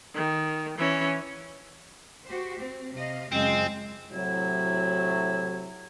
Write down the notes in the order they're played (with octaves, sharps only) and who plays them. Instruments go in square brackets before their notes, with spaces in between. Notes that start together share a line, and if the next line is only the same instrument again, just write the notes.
[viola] D#3
E3 C#4
[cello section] F#4 G4 C5
C4
C3 D#5 F5
[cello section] F#2 C#3 F4 [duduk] G#3 [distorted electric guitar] C4
[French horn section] A2 C3 F#3 [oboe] E4